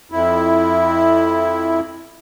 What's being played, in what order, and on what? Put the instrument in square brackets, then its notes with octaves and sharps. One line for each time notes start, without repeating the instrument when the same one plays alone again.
[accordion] F2 E4